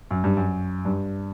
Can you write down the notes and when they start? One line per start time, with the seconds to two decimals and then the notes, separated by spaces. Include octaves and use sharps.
0.11 F#2
0.24 G2
0.37 F#2
0.85 G2